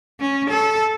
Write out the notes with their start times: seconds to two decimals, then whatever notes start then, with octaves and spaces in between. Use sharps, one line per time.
0.20 C#4
0.50 A4